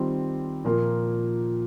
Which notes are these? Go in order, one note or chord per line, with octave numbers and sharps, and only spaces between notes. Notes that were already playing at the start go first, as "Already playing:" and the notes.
Already playing: D#3 G3 C4 F4
A#2 F3 A#3 F4